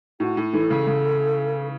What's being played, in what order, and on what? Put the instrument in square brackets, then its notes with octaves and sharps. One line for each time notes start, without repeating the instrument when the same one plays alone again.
[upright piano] A2 [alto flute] F#4
[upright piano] A2
[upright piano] E3 [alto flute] A4
[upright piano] C#3
C#3